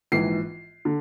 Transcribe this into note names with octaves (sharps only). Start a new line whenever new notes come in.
A#1 G#2 E3 C7
D3